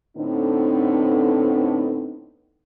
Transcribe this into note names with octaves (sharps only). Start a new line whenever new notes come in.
A2 D3 B3 C4 D#4